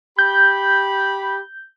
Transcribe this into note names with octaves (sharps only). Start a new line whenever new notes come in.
G4 B5 G6